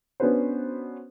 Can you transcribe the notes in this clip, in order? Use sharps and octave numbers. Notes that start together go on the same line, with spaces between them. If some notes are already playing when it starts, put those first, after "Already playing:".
B3 C#4 D4 F#4 B4 C5